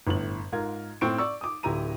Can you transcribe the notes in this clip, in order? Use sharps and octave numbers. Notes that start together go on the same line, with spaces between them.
G1 A2 F#7
G#2 F4 A#4 G#6
A2 C4 C#6 D7
D5 C#6 E6
D6 D#6
D1 D3 E4 G4 A#5 D#7